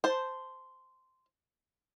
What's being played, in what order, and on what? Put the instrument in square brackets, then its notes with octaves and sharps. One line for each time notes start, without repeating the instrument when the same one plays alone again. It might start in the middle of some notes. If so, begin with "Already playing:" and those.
[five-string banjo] C5 A5